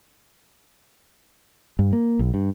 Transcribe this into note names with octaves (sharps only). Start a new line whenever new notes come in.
G2
A#3
B1
G2